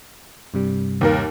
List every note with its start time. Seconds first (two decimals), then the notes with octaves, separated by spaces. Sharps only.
0.54 G2 C3 G3
1.01 D#2 A#3 A#4